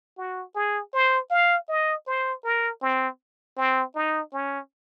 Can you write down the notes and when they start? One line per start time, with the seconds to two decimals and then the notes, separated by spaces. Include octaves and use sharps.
0.17 F#4
0.55 G#4
0.93 C5
1.31 F5
1.69 D#5
2.07 C5
2.44 A#4
2.82 C4
3.57 C4
3.95 D#4
4.33 C#4